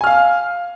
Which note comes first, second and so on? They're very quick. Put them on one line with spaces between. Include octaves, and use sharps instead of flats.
G#5 F6 F5